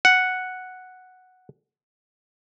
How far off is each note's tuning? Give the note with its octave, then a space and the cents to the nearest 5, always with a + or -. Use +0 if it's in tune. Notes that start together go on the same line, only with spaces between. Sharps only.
F#5 +0